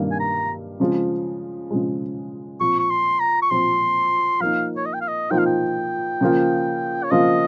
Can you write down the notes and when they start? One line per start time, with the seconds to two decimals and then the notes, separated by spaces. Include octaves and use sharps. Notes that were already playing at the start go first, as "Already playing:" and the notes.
Already playing: G2 D#3 G3 A#3
0.11 G#5
0.20 A#5
0.80 C#3 F3 G#3
1.71 C#3 F3 G#3
2.60 A#2 F3 C4 C#6
2.79 C#6
2.90 C6
3.20 A#5
3.42 C#6
3.51 A#2 F3 C4 C6
4.40 F3 A#3 D#4 F5
4.77 C#5
4.86 D#5
4.94 G5
5.01 F5
5.08 D#5
5.30 F3 A#3 D#4 G5
5.38 F5
5.47 G5
6.21 C#3 F3 A#3 F4
7.04 C#5
7.11 C#3 F3 A#3 F4 D#5